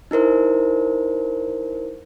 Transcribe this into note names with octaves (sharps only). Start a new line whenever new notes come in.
D#4 E4 A#4 C5